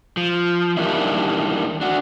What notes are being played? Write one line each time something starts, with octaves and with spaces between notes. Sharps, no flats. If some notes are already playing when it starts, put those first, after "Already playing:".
F3
E2 D#3 G3 A#3 D4 E4
D4 F#4